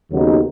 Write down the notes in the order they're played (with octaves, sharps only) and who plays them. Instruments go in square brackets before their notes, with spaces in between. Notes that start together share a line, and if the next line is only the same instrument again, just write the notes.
[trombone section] D#2 C#3 F#3 B3 D#4